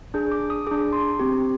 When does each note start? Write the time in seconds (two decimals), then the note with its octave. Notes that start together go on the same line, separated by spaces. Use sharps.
0.14 D4 G#4 G6
0.32 D6
0.50 D#6
0.67 D4 G#4 D6
0.93 C6
1.19 C4 G4